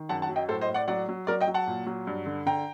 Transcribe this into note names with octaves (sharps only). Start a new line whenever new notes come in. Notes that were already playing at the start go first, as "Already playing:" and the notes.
Already playing: D#3
F#2 F#5 A5
F#5 A5
F#3
D#5 G5
A2 A4 C5
C5 D#5
A2
D5 F#5
F#3 D5 F#5
F#3
F#3 A#4 D5
D#5 G5
F#3
F#5 A5
A#2
F#3
G2
D3
D3 G5 A#5